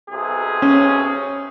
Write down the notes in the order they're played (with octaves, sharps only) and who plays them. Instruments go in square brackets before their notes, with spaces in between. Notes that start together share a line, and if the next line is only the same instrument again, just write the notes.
[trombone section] B1 C3 G#4
[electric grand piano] C#4